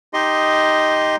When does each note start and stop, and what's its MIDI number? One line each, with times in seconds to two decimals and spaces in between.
0.14 1.16 63
0.14 1.16 67
0.14 1.16 75
0.14 1.16 84